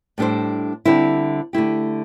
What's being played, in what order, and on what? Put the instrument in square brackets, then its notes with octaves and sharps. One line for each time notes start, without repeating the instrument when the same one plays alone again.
[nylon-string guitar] A2 G3 D4 A4 C5
D3 G3 C4 E4
D3 A3 E4 G4